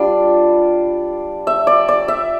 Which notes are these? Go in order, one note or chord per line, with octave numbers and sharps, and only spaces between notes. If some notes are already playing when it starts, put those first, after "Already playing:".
Already playing: G3 D4 F4 D5
E5
D5
D5
E5